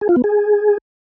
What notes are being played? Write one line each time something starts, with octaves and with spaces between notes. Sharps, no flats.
G#4
F4
B3
G#4